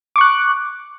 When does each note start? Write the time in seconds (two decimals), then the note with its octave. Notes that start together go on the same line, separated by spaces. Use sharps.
0.16 D6
0.18 C#6
0.21 F#6